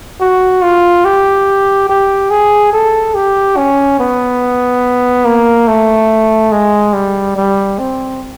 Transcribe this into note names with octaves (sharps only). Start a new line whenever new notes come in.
F#4
F4
G4
G4
G#4
A4
G4
C#4
B3
A#3
A3
G#3
G3
G3
C4